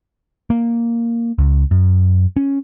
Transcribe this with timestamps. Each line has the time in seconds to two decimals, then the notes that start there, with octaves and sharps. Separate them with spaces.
0.50 A#3
1.38 C#2
1.71 F#2
2.37 C#4